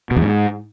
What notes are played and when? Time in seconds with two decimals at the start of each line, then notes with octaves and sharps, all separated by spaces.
0.11 B2
0.16 E2
0.22 G#2